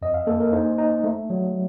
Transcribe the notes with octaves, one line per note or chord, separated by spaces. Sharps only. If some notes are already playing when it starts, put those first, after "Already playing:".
F2 D#5
F5
A#3 A4
A#4
D#4 C5
D#4
A3
F#3